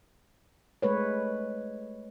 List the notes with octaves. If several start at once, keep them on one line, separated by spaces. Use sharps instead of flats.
G#3 A3 B4 C#5